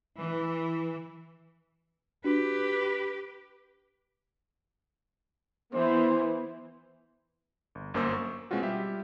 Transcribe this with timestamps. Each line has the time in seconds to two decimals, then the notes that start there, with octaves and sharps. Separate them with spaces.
0.20 E3
2.24 D4 F#4 G4 B4
5.74 E3 B3 C5
7.75 G1
7.94 G1 F#2 A#3 C5 D6 E6
8.14 C#6
8.51 B2 G#3 C4 C#4 F4 F#4
8.63 G3 F4 G4 E5